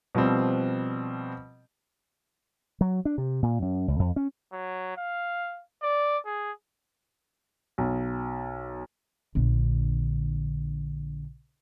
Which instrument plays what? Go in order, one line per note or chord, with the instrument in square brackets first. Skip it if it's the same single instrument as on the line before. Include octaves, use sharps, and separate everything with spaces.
[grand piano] B2 F3 G3 C4
[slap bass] F#3
D4
C3
A#2
F#2
C#2
F2
C#4
[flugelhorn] F#3
F5
D5
G#4
[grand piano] B1
[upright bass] A#1 D3